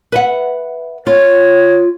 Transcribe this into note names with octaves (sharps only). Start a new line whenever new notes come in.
B4 E5 F#5
F4 C#5